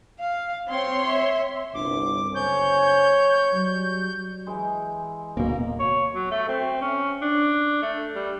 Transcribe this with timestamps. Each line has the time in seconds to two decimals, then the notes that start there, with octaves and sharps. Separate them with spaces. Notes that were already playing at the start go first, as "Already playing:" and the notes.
0.20 F5
0.69 C4 C#5 C6
1.08 E5
1.74 G1 C2 D6
2.35 F#1 C5 C#5 G#5 G6
3.53 F#3 G3
4.47 E3 G#3
5.37 D1 B2 A#3
5.79 C#5
6.15 F#3
6.31 A3
6.48 C4
6.81 C#4
7.21 D4
7.82 A3
8.15 G3